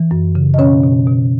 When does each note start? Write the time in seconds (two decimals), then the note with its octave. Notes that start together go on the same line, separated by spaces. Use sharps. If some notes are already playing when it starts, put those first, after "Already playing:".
Already playing: E3
0.11 F#2
0.35 C#3
0.54 D#5
0.58 B2 C#4 C#5
0.84 B2
1.07 B2